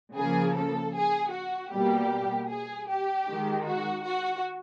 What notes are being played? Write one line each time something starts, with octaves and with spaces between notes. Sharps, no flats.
C#3 F3 A#3 G#4
A4
G#4
F#4
B2 G3 A#3 G4
G#4
G4
D#3 G#3
F#4
F#4